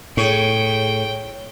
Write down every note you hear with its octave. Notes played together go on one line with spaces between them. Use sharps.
A2 G#4 C#5 G5